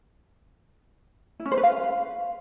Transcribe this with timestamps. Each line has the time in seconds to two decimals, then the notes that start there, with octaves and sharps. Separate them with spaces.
1.40 E4
1.46 C#4
1.51 C5
1.57 B4
1.63 F5